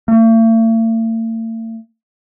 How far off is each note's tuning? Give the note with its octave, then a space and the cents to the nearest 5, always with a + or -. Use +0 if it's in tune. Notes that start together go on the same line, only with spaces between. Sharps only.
A3 +45